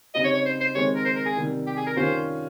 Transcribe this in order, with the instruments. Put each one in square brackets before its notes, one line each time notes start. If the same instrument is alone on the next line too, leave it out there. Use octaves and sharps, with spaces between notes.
[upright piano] C#3 G3 C4 D#4 [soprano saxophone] D#5
[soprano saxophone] C#5
C#5
C5
C5
[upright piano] D#3 G#3 C4 [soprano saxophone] C#5
[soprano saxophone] A#4
C5
A#4
G#4
[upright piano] C3 D#3 G3
[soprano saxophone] G4
G#4
A#4
[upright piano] D#3 G3 C#4 F4 [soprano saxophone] C5